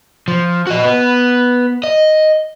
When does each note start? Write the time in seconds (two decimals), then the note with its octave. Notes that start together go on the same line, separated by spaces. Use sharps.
0.28 F3
0.67 F#4 D#5
0.84 B3
1.84 D#5